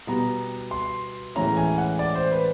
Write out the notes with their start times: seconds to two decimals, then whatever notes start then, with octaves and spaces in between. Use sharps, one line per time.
0.07 B2 G3 B3 A#5
0.71 C6
1.35 A2 E3 G#3 C#4 E4 A#5
1.57 G#5
1.78 F#5
1.99 D5
2.15 C5
2.32 B4